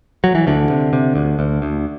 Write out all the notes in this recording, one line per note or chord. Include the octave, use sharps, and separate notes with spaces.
F#3
E3
D2 D3
C3
C3
D2
D2
D2